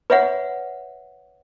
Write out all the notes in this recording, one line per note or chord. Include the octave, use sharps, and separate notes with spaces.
B4 C#5 E5 F#5